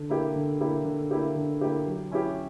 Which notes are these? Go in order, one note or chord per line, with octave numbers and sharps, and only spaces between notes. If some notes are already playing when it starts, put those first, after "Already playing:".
Already playing: D3
A#3 E4 G4
D3
A#3 E4 G4
D3
A#3 E4 G4
D3
A#3 E4 G4
F#3
C#4 E4 G4